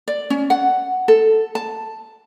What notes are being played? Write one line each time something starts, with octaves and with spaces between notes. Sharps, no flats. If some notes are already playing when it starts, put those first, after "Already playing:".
D5
C#4
F#5
A4
A5